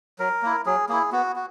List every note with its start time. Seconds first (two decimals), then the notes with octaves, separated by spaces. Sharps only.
0.19 F#3 A#4
0.43 A#3 E4
0.66 F#3 G#4
0.89 A#3 E4 G#4
1.12 B3 F#4
1.36 F#4